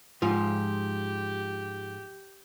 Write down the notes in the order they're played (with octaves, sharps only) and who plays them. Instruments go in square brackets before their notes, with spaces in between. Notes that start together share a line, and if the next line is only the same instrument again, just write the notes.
[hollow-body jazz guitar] G#2 F3 F4 [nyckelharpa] G4